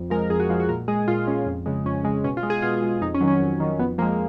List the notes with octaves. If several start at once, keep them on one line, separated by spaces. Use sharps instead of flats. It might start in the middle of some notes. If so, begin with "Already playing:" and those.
Already playing: F2
F3 G#3 A#4
F2 G#4
F#4
F3 G#3 F4
F#4
A#2 A#4
G#3 G#4
A#2 F4
G#3 C#4
F2
C#3 G#3
F2 C#4
C#3 G#3
B2 C#4
F4
G#3
G#4
B2 F4
G#3
F2 D#4
C#4
D#3 F#3
C#4
F2
D#3 F#3
F2 B3
F3 G#3 A#3